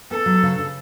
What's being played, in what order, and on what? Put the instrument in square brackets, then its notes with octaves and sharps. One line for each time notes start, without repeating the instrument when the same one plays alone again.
[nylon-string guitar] B3 [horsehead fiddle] A4
[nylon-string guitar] F#3
C#3
C#3